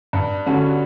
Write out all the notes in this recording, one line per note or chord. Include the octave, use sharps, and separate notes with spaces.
G2
D3 G3 C#4 F#4